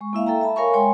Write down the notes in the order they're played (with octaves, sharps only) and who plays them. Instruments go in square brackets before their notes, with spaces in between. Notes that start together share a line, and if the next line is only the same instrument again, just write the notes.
[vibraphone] G#3 C#6
A#3 E4 E5 F5
A4 E5 G5 A#5
E5 A5 B5
A#4 C#5 F5 G#5 B5 C#6
G#3 C#5 G5 G#5 B5 C6